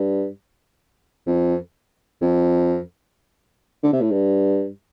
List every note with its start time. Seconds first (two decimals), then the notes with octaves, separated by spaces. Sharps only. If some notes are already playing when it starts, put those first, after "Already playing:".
Already playing: G2
1.27 F2
2.22 F2
3.83 D3
3.93 C3
4.01 A2
4.11 G2